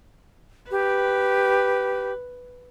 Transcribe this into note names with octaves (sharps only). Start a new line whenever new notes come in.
G4 B4